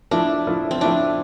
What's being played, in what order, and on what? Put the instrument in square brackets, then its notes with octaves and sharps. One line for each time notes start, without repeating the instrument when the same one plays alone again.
[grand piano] F3 A3 E4 [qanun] D4
[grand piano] F3 A3 E4
[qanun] C4
[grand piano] F3 A3 E4 [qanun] D4